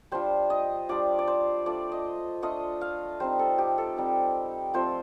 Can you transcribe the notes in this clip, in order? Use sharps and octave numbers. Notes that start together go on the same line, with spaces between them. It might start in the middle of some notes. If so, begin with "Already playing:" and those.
G3 D4 F4 C5
D#5
G3 D4 F4 D5
D5
C5
A3 D4 F4 D5
D#5
A3 D4 F4 D#5
F5
G3 C4 D#4 C5
A4
G4
A4
G3 C4 D#4
F3 A3 C4 F4 C5